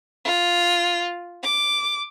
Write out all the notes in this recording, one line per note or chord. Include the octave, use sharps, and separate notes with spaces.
F4
D6